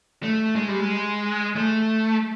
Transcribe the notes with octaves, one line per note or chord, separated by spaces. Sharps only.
A3
G#3
G3
G#3
A3